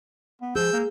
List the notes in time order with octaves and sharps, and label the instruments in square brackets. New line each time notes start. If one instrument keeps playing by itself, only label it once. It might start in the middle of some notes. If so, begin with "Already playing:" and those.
[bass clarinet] B3
[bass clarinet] F3 [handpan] G#4 [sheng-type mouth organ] E6 G6
[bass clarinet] A#3